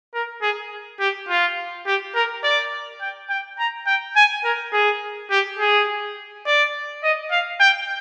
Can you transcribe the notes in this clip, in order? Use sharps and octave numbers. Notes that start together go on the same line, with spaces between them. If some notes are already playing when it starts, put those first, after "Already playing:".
A#4
G#4
G4
F4
G4
A#4
D5
G5
G5
A#5
G5
G#5
A#4
G#4
G4
G#4
D5
D#5
F5
G5